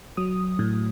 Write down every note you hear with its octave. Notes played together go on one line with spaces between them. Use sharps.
F#3 D#6
A2